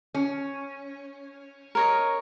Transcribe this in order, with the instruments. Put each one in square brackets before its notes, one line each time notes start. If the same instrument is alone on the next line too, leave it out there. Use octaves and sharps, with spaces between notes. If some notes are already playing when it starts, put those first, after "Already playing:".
[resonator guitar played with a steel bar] C#4
[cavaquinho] A#4 C#5 D#5